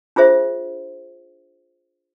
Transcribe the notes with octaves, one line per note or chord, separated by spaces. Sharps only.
D4 F4 G#4 C5 E5